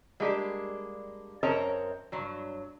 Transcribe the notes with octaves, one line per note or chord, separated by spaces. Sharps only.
G3 G#3 A#3 D4 G4
F#2 C4 A#4 C#5 D#5 A5
G2 F#3